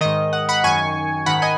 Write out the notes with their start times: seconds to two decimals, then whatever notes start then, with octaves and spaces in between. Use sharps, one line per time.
0.01 G#2 D#3 D#5
0.33 F#5
0.49 F#5 B5
0.64 F#2 D#3 G#5 C#6
1.26 G#2 D#3 F#5 B5
1.42 D#5 G#5